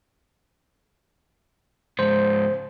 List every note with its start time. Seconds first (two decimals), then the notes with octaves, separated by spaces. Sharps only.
1.99 C#2 G#2 C5